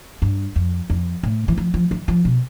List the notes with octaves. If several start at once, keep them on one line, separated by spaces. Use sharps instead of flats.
G2
F2
F2
A2
E3
F3
F3
E3
F3
B2